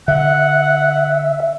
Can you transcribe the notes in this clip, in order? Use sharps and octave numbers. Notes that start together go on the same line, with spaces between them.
D3 E5 F#5